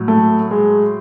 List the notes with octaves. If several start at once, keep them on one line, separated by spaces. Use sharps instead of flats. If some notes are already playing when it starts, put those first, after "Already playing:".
Already playing: A2 F#3
A3
G#3